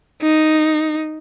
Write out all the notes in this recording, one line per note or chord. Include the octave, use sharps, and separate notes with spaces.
D#4